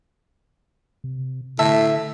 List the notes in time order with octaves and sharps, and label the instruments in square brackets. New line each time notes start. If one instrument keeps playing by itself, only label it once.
[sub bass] C3
[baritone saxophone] A2 [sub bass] D3 [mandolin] E5 [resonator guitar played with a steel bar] A5